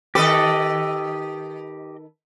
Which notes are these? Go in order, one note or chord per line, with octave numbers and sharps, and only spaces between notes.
D#3 G4 A4 B4 D#5